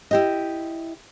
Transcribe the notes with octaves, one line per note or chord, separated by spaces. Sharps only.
E4 G4 D#5